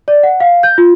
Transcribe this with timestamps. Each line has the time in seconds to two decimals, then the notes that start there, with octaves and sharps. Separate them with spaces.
0.08 D5
0.23 F#5
0.40 F5
0.63 G6
0.78 F4